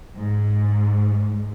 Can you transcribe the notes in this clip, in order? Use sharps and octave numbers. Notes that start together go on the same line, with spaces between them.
G#2